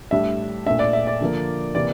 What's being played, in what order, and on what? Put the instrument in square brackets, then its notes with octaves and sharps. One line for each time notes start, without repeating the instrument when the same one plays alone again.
[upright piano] A2 G3 D4 E5
A#2 A3 D4 E5
D5
E5
D5
D3 F3 A#3
C3 E3 A#3 D5